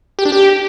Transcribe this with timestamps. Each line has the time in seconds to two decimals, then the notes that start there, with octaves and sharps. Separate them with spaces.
0.19 G4
0.25 D4
0.32 G4